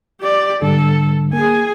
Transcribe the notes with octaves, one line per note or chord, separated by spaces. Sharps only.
G4 D5
G#2 D3 G3 A4
A#3 G#4 G#5